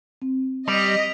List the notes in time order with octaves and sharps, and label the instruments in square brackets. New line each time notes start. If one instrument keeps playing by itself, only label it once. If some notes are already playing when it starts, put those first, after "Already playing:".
[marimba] C4
[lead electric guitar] G3 [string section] D#5 [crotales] B6 D7 F7